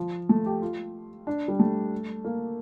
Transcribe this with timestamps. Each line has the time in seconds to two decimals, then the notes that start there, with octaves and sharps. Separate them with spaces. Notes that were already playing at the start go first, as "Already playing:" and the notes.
Already playing: F3
0.29 A3
0.46 G4
0.62 F4
1.27 D4
1.48 G3
1.59 A3
2.25 A#3